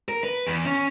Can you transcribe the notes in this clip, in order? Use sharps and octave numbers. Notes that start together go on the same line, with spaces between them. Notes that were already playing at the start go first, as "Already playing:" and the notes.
A#4
B4
E2
C#4